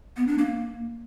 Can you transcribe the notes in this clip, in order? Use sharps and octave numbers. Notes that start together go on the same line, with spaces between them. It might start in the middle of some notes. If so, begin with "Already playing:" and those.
B3
D4
A#3